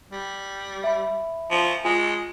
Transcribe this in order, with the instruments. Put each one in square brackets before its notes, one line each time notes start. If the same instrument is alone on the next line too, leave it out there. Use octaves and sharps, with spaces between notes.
[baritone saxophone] G3
[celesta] E5 B5
[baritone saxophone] F3
[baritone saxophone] G#3 [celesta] F4